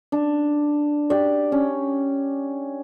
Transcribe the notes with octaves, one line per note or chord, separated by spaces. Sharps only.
D4
G4 D5
C#4